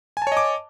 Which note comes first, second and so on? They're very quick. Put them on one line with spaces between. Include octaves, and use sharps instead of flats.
G#5 A5 C#5 D#5 D6